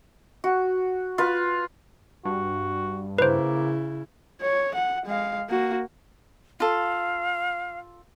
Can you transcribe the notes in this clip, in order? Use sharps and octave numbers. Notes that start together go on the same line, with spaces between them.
F#4
F4 B4
G2 F#4
C#3 A#3 E4 B4 C5
C#5
F#5
G#3 F5
A#3 F#4
F4 A4 F5